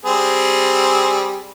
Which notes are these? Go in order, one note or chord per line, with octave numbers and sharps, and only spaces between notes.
G3 C4 G#4